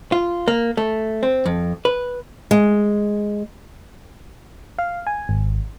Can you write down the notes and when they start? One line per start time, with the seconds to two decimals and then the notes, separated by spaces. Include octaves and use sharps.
0.12 F4
0.48 A#3
0.77 A3
1.23 C4
1.46 F2
1.85 B4
2.51 G#3
4.79 F5
5.07 G#5
5.29 G#1